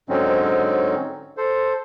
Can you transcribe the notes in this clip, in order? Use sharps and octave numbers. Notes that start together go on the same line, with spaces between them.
G#2 D3 F#3 C4 C#4 D#4
A4 C5